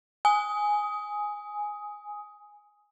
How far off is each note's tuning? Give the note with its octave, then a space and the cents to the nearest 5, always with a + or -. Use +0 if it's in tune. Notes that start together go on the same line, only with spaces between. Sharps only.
G#5 +0 D#6 +15